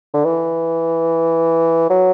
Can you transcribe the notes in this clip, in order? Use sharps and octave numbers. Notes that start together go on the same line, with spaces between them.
D3
E3
F#3